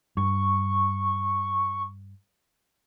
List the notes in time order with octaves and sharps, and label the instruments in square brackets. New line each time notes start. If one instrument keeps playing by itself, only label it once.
[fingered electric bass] G2 [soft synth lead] C#6